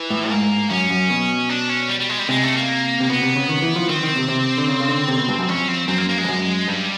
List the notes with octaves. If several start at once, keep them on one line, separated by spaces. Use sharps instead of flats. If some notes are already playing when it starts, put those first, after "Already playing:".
Already playing: E3
A2
G#2 A#3
F#2 C#4
F#2
B2
D4
C#4
G3
G3
G#3
G3
C3 G#3
A3
A#3
C3
B2 B3
C3
C#3
D#3
E3
F3
D#3 C4
D#3
C3
C3
D3
C#3
C#3
D3
C3
B2
G2
F#2
F2 C#4
C4
F#2 C4
A#3
A#3
G#3
F2
F#2
G2 G3